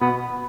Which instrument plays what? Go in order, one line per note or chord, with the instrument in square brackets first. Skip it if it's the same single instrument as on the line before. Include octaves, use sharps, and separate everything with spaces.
[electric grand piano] B2 [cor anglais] B3